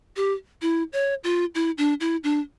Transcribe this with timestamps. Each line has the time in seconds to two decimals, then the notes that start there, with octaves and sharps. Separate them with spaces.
0.16 G4
0.62 E4
0.93 C#5
1.24 F4
1.55 E4
1.78 D4
2.00 E4
2.24 D4